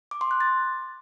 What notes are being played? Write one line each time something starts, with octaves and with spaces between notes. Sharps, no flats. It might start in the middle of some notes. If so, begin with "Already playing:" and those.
D6
C6
F#6
A6